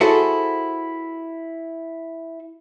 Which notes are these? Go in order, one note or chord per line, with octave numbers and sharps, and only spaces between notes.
E4 F#4 G#4 A4 C5